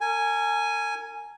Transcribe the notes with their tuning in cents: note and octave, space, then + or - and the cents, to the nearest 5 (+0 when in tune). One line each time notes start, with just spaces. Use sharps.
A#4 -40 G#5 +0